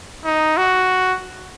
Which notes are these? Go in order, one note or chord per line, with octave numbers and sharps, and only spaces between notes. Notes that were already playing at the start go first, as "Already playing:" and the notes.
D#4
F#4